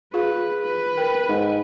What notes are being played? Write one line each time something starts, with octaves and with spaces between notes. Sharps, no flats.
F4 G#4 B4 F5
B4
A#4 G5
G#2